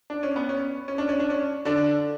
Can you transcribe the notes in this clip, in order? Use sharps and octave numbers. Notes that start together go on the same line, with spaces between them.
D4
C#4
B3
C#4
C#4
D4
C#4
D4
C#4
D3 D4